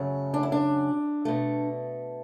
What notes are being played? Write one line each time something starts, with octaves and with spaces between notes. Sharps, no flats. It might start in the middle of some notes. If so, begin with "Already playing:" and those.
Already playing: F#2 C#3 F#3 A3
D4
E4
D4
B2 A3